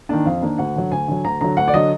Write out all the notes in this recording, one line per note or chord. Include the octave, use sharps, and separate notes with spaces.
D#3 A#3 D4
F2 F5
D#3 A#3 D4
D2 F#5
D3 F#3
D2 G#5
D3 F#3
D2 A#5
D3 F#3 A#5
D2 F#5
D5
D3 F#3 D#5